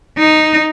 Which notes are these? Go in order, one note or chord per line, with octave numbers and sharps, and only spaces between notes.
D#4